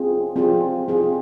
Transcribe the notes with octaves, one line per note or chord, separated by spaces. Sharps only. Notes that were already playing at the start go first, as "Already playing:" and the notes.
Already playing: C4 F4 G#4
C4 F4 G#4
C4 F4 G#4